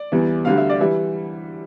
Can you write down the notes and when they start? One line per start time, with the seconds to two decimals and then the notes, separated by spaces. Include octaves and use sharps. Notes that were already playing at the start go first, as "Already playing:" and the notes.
Already playing: D5
0.12 E2 E3 G3
0.45 D2 D3 G3 F5
0.57 E5
0.69 D5
0.80 E3 G3 E5